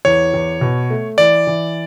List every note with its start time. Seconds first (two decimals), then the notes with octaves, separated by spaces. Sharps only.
0.05 E2 C#5
0.34 E2
0.61 B2
0.90 A3
1.18 E3 D5
1.47 E3